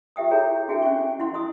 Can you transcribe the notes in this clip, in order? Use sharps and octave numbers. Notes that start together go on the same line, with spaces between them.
F4 G4 E5 G5 D#6
E4 F#4 G#4 A4 C#5 A#5
D4 F#4 G#4 E5 G5 G#5
C#4 D#5 F#5 G#5 C#6
E4 F#5 C6
D#5 C6 D#6